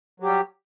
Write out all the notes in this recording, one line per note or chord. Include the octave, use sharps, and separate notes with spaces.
F#3 G3 G4